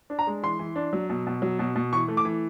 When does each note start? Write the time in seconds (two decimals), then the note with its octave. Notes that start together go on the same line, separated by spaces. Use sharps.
0.10 D4
0.19 A#5
0.27 G#3
0.43 E3 C6
0.59 E3
0.76 D4
0.93 F#3
1.09 B2
1.27 B2
1.42 F#3
1.59 B2
1.76 B2
1.92 E3 C#6
2.08 A3
2.17 D6
2.25 E3